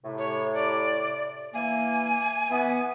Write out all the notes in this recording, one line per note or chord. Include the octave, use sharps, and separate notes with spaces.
A2 C3
C#5
D5
E3 A#3 G#5
E3 B3